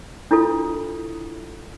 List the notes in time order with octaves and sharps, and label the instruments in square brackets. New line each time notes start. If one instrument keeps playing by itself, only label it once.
[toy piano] D4 E4 F4 A4